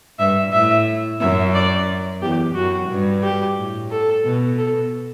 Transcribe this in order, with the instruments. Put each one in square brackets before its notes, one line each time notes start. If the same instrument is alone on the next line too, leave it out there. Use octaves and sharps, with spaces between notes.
[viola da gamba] G2 [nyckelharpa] E5
[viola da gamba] A2 [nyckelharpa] E5
[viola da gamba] F#2 [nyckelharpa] E5
[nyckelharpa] D5
[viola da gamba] E2 [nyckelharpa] G4
[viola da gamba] F#2 [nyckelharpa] F#4
[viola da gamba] G2
[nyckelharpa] G4
[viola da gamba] A2
[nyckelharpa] A4
[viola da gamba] B2
[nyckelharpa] A4